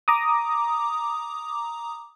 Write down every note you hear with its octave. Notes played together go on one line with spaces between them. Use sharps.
A#5 D6 D#6